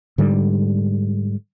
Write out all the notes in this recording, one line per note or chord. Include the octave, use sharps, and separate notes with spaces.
G#2 D3 G3